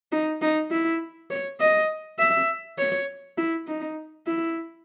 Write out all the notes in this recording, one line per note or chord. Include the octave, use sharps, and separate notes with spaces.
D#4
D#4
E4
C#5
D#5
E5
C#5
E4
D#4
E4